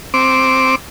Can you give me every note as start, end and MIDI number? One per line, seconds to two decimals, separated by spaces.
0.14 0.75 60
0.14 0.75 86